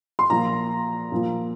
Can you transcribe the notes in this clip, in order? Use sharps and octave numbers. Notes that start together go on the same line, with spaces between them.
C6
A#2 F3 A#5
A#2 F3